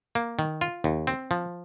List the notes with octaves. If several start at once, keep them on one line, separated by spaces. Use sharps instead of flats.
A#3
D#3
F4
D#2
C4
F3